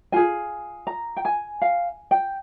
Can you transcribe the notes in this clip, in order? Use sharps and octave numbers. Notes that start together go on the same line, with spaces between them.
F4 G#4 G#5
A#5
G5
G#5
F5
G5